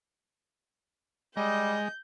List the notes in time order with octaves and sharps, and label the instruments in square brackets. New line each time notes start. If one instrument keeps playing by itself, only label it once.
[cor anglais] G3 [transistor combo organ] G#3 [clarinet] D#5 [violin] G6